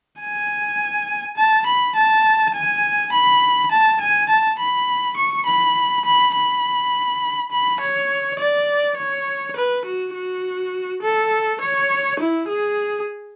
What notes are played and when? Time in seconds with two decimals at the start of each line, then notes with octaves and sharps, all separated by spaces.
0.20 G#5
1.37 A5
1.66 B5
1.95 A5
2.55 G#5
3.13 B5
3.72 A5
4.01 G#5
4.29 A5
4.59 B5
5.17 C#6
5.46 B5
6.05 B5
6.35 B5
7.52 B5
7.80 C#5
8.39 D5
8.98 C#5
9.56 B4
9.85 F#4
10.14 F#4
11.02 A4
11.61 C#5
12.20 E4
12.49 G#4